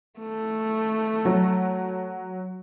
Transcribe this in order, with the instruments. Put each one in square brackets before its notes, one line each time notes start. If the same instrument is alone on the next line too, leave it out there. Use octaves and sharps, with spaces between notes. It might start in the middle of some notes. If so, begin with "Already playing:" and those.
[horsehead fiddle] A3
[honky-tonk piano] F#3